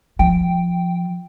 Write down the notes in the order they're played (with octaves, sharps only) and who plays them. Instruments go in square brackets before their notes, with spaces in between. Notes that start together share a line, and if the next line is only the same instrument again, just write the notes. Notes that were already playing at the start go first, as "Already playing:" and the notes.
[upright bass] F3 [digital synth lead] G5